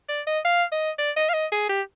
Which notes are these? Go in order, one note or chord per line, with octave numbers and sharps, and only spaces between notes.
D5
D#5
F5
D#5
D5
D#5
F5
D#5
G#4
G4